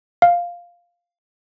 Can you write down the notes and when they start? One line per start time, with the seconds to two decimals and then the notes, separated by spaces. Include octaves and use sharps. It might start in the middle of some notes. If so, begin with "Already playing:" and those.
0.22 F5